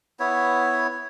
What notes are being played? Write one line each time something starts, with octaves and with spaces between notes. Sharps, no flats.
B3 E4 C#5